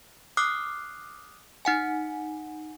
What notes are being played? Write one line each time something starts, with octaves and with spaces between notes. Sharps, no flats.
D6 D#6 F6 F#6 C7
D#4 F#5 G#5